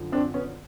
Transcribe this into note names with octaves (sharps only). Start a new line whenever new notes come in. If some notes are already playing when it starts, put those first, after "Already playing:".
Already playing: F#2 D3 F3
C4 D4
B3 C#4